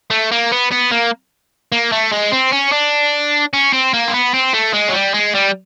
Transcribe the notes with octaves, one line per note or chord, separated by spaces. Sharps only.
A3
A#3
B3
B3
A#3
A#3
A3
G#3
C4
C#4
D4
C#4
C4
A#3
C4
B3
C4
A3
G#3
F#3
G3
G#3
G3